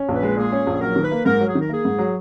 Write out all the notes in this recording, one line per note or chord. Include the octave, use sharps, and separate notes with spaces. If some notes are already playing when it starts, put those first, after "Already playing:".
Already playing: C#4
A#1
B4
G#3
A#2 G#4
C#4
A#1
G#4
F#3 A#4
D#3
B4
A#3
G#2 A#4
F#3
G#4
D#3
A#4
A#3 G#4
G#2
F#3